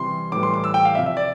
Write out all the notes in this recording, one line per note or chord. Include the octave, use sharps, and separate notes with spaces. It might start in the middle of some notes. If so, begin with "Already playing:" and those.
Already playing: C3 E3 G3 C6
A2 E3 G3 D6
C6
D6
E6
G5
F5
C3 F3 E5
E5
D5